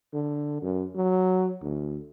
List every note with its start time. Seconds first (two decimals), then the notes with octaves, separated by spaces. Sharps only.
0.14 D3
0.62 F#2
0.95 F#3
1.63 D2